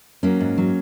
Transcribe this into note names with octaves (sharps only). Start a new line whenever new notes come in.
F#3 A#3 C#4
G#2
F#3